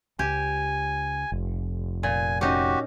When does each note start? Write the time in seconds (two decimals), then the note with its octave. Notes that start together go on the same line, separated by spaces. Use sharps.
0.19 C#2 G4 G#5
1.32 F1
2.03 A#2 G#5
2.41 C#4 D#4 F#4 G4